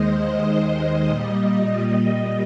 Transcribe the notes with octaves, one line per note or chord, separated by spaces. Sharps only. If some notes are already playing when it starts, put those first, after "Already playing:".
Already playing: D#2 D#3 G#3 C5 D#5
D#5
A#2 G3